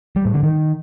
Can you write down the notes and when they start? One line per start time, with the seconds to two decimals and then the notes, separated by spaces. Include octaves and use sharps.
0.16 G3
0.25 A2
0.34 D3
0.43 D#3